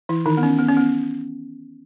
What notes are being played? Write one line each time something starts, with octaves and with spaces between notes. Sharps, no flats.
E3 E4
D#3 D#4
B3
C#4
B3
C#4
B3